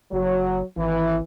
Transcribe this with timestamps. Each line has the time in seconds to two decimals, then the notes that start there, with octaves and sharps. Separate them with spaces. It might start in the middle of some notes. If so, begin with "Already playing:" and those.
0.12 F#1 F#3
0.76 G#1 E3